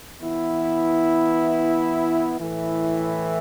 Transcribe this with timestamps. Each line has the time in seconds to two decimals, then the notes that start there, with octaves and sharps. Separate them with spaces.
0.21 E3 B3 E4
2.39 A2 E3 A3 E4